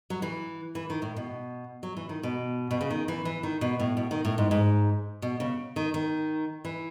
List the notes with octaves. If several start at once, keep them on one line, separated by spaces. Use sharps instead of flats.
F#3
E3
E3
D#3
A2
B2
F#3
E3
D#3
B2
B2
C#3
D#3
E3
E3
D#3
B2
A2
B2
D#3
A2
G#2
G#2
B2
C#3
D#3
D#3
E3